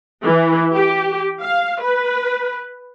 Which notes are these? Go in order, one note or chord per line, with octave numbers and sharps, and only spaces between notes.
E3
G4
F5
B4